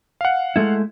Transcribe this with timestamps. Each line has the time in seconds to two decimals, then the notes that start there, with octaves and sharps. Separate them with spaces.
0.21 F5 F#5
0.56 G#3 A3 E4